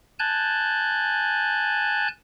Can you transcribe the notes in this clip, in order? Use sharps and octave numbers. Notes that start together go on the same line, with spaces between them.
G#5 A5 F#6 G6